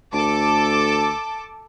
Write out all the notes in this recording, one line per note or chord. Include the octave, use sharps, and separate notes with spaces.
D2 A4 A5 D6